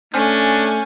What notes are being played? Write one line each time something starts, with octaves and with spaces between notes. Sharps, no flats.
A3 C#4 D4 G#5 F6 G6